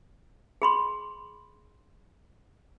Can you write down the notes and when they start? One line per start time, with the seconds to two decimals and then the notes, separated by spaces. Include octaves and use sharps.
0.62 G#4 B5 C6